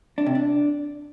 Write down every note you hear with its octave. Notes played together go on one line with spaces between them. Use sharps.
D4
C3
D4